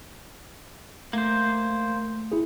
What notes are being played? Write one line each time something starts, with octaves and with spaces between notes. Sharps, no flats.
A3 A#3 C5
E4 G#4